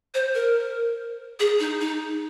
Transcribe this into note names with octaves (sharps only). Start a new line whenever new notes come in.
C5
A#4
G#4
D#4
D#4